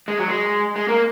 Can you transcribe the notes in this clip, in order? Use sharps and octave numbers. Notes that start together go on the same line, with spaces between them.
G#3
F#3
G#3
G#3
A#3